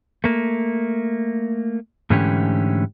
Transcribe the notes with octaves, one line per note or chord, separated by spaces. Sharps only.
A3 A#3
G#2 D3 E3 A3 C#4 G4